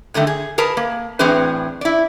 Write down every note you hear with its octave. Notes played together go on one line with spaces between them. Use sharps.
G2 D3 D#3 A3
G#4
G#4 A#4 B4 A5
A#3
A2 E3 C4 D4 G#4 B4
E4 D5